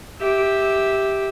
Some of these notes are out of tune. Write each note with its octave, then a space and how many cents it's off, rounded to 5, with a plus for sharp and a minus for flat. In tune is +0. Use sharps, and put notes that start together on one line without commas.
G4 +0 E5 -10